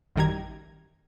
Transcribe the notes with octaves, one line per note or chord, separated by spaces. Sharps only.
A1 F#2 D#3 G3 A#5 G#6